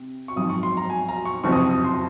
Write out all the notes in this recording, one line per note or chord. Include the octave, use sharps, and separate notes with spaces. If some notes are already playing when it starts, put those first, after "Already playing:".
Already playing: C3
C#6
G#1 F#2 F3 D#6
C#6
C6
A#5
G#5
A#5
C#6
F#1 F2 C3 F3 C#6
D#6
C#6
D#6
C6